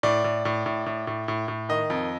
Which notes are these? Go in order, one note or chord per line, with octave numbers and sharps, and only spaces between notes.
A2 D5
A2
A2
A2
A2
A2
A2
A2
D#3 D#5
F2